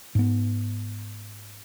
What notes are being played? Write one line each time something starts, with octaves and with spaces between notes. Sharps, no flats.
G#2 B3